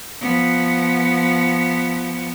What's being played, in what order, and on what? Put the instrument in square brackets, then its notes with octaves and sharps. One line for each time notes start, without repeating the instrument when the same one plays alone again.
[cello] F3 B3